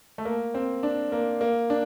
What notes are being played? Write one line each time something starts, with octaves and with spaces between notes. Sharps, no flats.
A3
A#3
C4
D4
A#3
A#3
D4